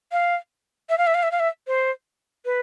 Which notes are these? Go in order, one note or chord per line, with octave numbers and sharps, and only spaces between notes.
F5
E5
F5
E5
F5
E5
F5
E5
C5
B4